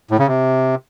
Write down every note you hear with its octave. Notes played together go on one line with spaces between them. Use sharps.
A2
C#3
C3